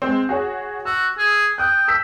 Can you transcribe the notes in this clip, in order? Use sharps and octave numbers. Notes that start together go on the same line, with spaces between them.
G#3 C4
F#4 G#4 C#5
F#4 E6
G#4
G5 D#6 F#6
E6 G6 B6